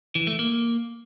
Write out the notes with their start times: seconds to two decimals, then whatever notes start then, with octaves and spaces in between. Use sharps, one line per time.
0.15 E3
0.27 A3
0.39 A#3